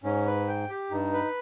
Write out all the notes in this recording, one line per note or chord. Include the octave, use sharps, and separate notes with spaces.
G#2 C#4
B4
G5
G4
G2 D#4
B4